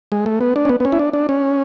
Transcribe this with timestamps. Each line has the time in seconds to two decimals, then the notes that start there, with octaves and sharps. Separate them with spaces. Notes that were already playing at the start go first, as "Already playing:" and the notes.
0.12 G#3
0.26 A3
0.41 B3
0.56 D4
0.65 C#4
0.69 B3
0.80 B3
0.85 C#4
0.92 E4
0.99 D4
1.13 D4
1.29 C#4